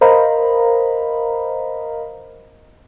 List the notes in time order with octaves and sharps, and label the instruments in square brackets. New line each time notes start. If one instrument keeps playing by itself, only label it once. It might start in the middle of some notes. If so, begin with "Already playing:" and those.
[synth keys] A#4 C5 D#5 F5 A#5 B5